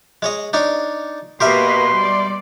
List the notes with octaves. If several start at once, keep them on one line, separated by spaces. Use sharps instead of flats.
G#3 C#5 D#5
D4 D#4 C#5
B2 A#3 G4 A#4 B4 E5 C6
G3 D5